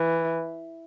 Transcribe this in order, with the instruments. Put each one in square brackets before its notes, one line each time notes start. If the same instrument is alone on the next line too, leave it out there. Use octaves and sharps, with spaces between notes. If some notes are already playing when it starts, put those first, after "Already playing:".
Already playing: [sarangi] E3